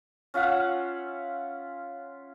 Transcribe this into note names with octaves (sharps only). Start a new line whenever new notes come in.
C#4 F4 E5 F#5